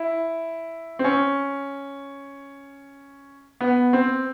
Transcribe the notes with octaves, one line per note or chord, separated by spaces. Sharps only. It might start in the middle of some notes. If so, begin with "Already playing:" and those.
Already playing: E4
C4
C#4
B3
C4